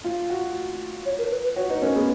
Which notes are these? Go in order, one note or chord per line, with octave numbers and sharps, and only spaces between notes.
F4
F#4
C#5
A#4
B4
B4
F#4 C#5
D#4 B4
C#4 A#4
B3 G#4